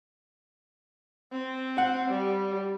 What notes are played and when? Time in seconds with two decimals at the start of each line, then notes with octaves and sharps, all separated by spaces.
1.32 C4
1.78 F#5
2.10 G3